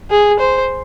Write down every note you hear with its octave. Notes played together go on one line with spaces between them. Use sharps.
G#4
C5